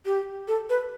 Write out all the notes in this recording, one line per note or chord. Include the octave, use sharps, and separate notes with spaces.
G4
A4
B4